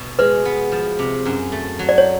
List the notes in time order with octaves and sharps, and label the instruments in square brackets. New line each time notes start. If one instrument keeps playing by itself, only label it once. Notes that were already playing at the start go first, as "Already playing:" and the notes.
Already playing: [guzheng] B2
[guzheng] G#3 [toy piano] B4
[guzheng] B3
F3
C3
F#2
A3
F#3
[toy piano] D5
C#5